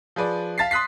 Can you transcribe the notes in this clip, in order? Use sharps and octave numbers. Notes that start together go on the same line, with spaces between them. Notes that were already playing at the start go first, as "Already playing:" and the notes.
F3 G#4 B4 D5
F5 A5 A6 B6 C7
C6 D#6 F#6 B6 C7